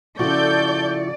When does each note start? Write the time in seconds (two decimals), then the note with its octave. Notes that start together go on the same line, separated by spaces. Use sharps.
0.19 C#3 F3 E4 F#4 A4 D5 C#6 G6